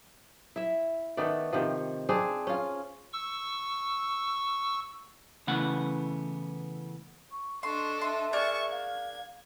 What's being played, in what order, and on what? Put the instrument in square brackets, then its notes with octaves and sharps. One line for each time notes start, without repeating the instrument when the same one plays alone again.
[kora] E4 E5
D#3 A3 B3 D5
C3 D#3 F3
C4 D4 G#4
C#4 F4
[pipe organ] C#6 E6
[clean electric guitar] C#3 E3 A3 B3 F#5 B5
[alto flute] C#6
[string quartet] D4 A4 D#5 [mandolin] C6 [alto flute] C#6
[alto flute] E5 [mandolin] C6
[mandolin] D4 G#4 A#4 [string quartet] A5 C#6
[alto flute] F5 [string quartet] G#6